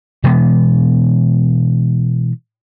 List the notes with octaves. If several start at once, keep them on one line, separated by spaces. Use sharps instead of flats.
B2 E3 G#3 B3